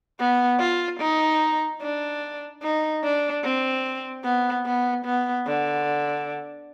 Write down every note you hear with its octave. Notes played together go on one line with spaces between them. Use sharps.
B3
F4
D#4
D4
D#4
D4
C4
B3
B3
B3
D3